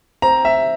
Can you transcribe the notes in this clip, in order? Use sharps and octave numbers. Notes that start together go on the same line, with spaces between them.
C4 A#5
E5